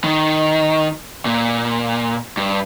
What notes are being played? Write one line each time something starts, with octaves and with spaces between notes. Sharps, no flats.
D#3
A#2
G2